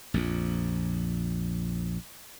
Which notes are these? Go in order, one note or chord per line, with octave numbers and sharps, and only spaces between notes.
A#1 F2